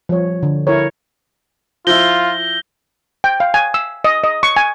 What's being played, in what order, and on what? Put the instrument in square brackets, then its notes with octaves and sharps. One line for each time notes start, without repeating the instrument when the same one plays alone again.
[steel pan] F3 G3 C#5
D3
E4 A4 A#4 C#5
[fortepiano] F3 E4 [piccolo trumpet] F4 [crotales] G6 A#6 G7
[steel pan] G5
F5
G#5
E6
D#5
D#5
C#6
G#5